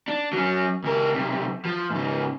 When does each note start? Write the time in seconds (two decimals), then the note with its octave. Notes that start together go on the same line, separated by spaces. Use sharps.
0.08 D4
0.33 F#3 C#4
0.84 C#2 A#4
1.14 B1 C3
1.65 F3
1.90 G#2 C#3